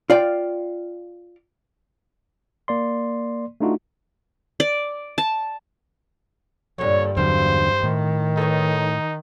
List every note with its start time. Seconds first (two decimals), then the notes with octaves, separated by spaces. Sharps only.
0.10 F4 D5 F5 G5
2.68 A#3 D5 C6
3.61 A3 D4 D#4 F4 F#4
4.60 D5
5.18 A5
6.78 G2 A#2 D3 C#5
7.17 E2 D3 F#3 C4 C5 F5
7.83 A2 D#3
8.37 D#4 A4 B4 C#5